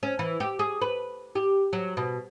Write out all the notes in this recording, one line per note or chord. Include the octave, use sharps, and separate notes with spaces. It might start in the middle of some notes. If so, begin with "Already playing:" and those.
C#4
E3
G4
G#4
B4
G4
F#3
B2